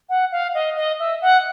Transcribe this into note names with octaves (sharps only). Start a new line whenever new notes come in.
F#5
F5
D#5
D#5
E5
F#5